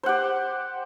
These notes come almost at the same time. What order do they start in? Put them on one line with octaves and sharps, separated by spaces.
C5 F#5 G4